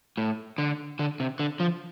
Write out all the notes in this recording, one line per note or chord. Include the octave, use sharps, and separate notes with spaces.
A2
D3
D3
C3
D3
F3